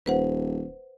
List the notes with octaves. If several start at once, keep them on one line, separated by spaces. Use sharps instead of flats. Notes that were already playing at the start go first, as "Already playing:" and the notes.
D#1 B4 C5 F#5